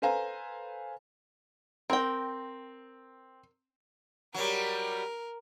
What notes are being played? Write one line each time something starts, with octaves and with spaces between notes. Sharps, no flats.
A4 B4 C5 F5 G#5 A#5
C4 A#4 G5
F#3 G3 A#4